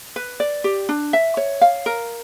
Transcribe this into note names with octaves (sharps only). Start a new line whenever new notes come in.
B4
D5
G4
D4
E5
C#5
F5
A#4